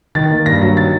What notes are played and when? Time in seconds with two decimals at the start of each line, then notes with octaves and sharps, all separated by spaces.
0.15 D#3 A6
0.30 A#3
0.46 G2 A#6
0.61 F#3
0.77 D#3 A6